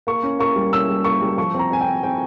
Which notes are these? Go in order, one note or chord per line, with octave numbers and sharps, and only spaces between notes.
A#3 C#6
C#4
A#3 C#6
G3
C#4 E6
G3
A#3 C#6
G3
F3 C#6
C4 A#5
C4 G#5
G5
C4
C4 G5